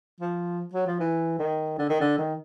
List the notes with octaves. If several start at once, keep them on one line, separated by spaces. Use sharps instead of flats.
F3
F#3
F3
E3
D#3
D3
D#3
D3
D#3